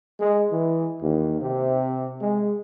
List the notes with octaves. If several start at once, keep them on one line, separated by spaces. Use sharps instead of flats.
G#3
E3
D#2
C3
G#3